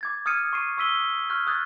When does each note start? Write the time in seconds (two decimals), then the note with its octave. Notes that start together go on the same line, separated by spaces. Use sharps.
0.01 D6 G#6 A6
0.26 D#6 F6 G#6 C#7 D#7
0.53 C#6 C7 D#7
0.78 C#6 D#6 E6 B6 D#7 G7
1.30 C#6 D#6 F6 F#6 G#6
1.47 D#6 F#6 G#6 A6